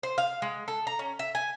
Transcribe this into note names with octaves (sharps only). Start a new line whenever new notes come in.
C5
F5
G#3
A4
A#5
C#4
E5
G#5